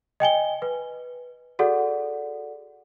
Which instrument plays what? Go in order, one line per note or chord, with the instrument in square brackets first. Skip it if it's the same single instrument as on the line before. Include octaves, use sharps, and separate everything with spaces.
[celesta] D#5 G5 G#5 G7
B4
F#4 G#4 A4 D5 F#5